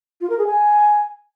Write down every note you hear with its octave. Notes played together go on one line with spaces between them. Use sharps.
F4
A#4
G#4
G#5